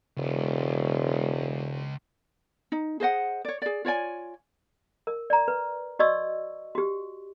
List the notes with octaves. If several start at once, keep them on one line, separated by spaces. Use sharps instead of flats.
E1 C#2
D#4
G#4 C5 D#5 F#5
C#5 D5
G#4 D5
F4 C#5 D5 G#5
A#4
D5 A#5
B4
F#4 D5 D#5 C#6 E6
F#4 G4